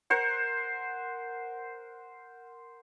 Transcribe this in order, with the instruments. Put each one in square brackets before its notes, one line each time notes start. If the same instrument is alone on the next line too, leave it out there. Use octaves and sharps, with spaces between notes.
[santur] A#4 C5 F#5